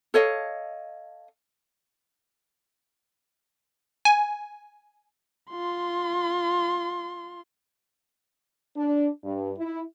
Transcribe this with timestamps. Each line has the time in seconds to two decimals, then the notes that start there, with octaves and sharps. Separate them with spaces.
0.14 A4 C#5 D#5 F5
4.05 G#5
5.51 F4 C6
8.76 D4
9.24 G2
9.58 E4